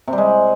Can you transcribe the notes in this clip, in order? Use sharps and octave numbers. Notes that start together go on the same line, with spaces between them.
C3
G3
G#3